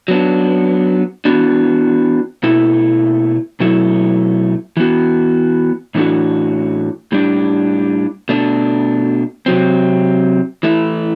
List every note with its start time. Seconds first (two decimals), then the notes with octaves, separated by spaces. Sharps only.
0.08 F#3 B3 D4
1.25 E3 B3 D4 F#4
2.43 B2 A3 E4
3.60 B2 F#3 A3 E4
4.77 E3 B3 F#4
5.95 A2 E3 A3 D4 F#4
7.12 A2 G3 D4
8.29 B2 A3 D4
9.46 C3 F#3 C4
10.63 E3 A3 E4